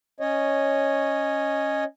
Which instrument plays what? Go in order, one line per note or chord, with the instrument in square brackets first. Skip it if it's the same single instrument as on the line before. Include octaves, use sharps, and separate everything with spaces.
[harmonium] C#4 C#5 D#5